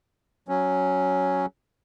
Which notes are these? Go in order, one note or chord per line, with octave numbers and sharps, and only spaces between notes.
F#3 C#4